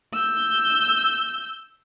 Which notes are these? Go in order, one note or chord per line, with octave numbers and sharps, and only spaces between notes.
E6 G6